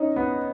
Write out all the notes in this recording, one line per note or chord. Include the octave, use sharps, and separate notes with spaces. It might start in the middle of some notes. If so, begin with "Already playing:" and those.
Already playing: C#4 D#4
B3